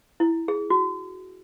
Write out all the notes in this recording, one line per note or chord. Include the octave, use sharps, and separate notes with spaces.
E4
G#4
F#4